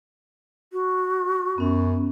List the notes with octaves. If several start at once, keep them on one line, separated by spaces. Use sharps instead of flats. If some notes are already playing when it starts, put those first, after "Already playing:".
F#4
F#2 B3 C#4